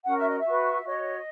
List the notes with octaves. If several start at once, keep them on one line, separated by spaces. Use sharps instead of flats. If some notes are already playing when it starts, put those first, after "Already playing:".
C#4 F#4 A#4 F#5
E5
D#5
E5
F#4 B4
F#4 C#5 D#5